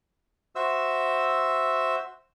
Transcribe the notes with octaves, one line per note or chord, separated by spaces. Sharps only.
F#4 C5 E5 E6